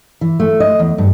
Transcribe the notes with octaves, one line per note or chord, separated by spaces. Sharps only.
E3
A3
D#5
E2
G2